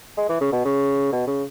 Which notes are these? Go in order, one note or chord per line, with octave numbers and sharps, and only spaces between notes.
G#3
E3
C#3
B2
C#3
B2
C#3